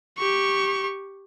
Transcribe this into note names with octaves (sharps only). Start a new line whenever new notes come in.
G4 C#6